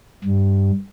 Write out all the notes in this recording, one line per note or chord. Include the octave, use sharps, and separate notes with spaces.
G2